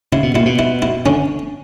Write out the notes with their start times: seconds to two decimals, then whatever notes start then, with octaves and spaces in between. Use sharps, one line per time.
0.12 C#3 E4
0.23 B2
0.34 A#2 E4
0.46 B2
0.59 E4
0.82 E4
1.06 D3 C#4